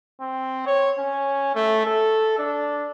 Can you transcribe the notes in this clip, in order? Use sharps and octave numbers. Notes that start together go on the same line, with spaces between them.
C4
C#5
C#4
A3
A4
D4